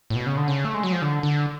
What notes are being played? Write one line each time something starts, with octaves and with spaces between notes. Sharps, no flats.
A2
B2
C#3
D3
C#3
A3
G#3
F#3
F3
D3
D3